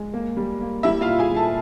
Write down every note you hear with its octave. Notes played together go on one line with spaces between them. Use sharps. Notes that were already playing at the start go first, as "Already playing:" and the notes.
Already playing: G#3
A#3
G3
A#3
G3 E4 E5
F4 F5
A#2
G#4 G#5
G3
A4 A5